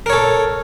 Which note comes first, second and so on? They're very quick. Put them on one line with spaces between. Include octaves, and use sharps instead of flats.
A#4 C#5 A4